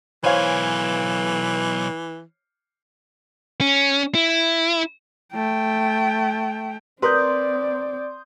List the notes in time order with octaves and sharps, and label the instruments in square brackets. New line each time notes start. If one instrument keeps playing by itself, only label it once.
[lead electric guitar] B1 G#5 [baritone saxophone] E3 [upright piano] C5 C#5 F5
[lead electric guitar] C#4
E4
[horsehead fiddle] A3 G5
[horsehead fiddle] C4 D5 [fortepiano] A#4 B4 [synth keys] C6 D#6 G6